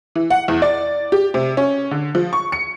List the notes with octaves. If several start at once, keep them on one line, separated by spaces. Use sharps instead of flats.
E3
F#5
E2
D5
G4
C3
C#4
D3
F3
C#6
C#7